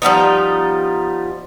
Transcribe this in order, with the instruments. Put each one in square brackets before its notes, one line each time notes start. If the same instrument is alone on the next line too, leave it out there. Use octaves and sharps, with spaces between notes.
[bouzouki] F3 G3 B3 D#4